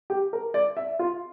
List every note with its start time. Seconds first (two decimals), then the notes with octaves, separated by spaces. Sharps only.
0.10 G4
0.33 A#4
0.54 D5
0.77 E5
0.99 F4